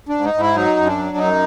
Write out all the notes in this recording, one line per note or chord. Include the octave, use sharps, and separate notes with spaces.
D4
G#2
D#4
G#2
E4
F#3 D#4
F#2
D4
F#3
F#2 D#4